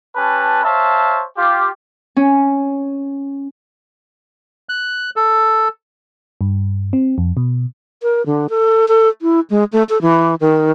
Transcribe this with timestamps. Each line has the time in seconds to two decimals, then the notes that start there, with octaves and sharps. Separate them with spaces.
0.16 C#4 G4 B4 A5
0.64 C5 C#5 E5 F5 A5
1.37 F4 G4
2.16 C#4
4.69 F#6
5.16 A4
6.41 G2
6.93 C4
7.18 F2
7.37 B2
8.03 A#4
8.26 D3
8.50 A4
8.88 A4
9.22 E4
9.50 G#3
9.73 A3
9.89 A4
10.02 E3
10.41 D#3